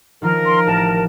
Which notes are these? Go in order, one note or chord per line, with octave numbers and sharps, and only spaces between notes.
D#3 F3 F4 A#4
C6
A1 A5